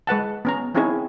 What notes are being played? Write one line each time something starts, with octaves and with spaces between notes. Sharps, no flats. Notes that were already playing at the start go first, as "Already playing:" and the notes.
G#3 B4 F#5 A5
B3 C#4 A#5
C4 C#4 D#4 E4 G#4 C#5